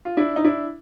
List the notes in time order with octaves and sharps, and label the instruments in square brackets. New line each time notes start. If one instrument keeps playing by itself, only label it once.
[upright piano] F4
D4 E4
D#4
D4 E4